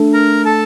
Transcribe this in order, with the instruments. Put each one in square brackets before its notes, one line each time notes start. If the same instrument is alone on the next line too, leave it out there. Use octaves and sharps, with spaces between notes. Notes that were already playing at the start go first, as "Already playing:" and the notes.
Already playing: [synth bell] A3 D4 A4
[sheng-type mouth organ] A#4 A#5
A4 A5